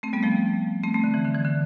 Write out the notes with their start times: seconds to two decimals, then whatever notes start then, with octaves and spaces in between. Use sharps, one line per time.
0.03 A3 C4
0.13 G3 B3
0.23 F3 A3
0.83 A3 C4
0.94 A3 C4
1.04 D3
1.14 E3
1.25 D3
1.35 E3
1.45 D3